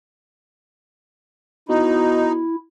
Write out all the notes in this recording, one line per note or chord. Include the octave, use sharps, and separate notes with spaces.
B2 D#4 E4